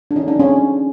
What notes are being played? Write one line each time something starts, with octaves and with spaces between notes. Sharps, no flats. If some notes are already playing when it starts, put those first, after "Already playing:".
D4
E3 C#4 D#4
D4
C4 C#4